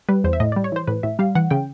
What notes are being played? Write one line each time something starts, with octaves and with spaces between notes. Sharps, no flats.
G3 B4
E2 C5
E5
A2 D#5
G3 D5
C#5
E3 C5
A2 B4
A2 E5
G3 F5
E3 F#5
C#3 G5